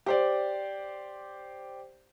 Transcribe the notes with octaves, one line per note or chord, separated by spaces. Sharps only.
G4 C5 D5